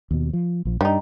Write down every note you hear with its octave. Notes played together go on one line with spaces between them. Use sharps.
D#2 B2
F3
A#1 F3
G2 G3 D#4